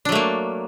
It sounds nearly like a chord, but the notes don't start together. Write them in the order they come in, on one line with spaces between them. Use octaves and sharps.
D4 F#3 A3 A#3